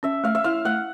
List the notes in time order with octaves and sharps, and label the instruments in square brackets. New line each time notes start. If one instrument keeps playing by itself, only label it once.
[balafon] C#4 [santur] E5
[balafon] A3 [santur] F5
[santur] E5
[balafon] E4 [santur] F5
[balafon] A3 [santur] F#5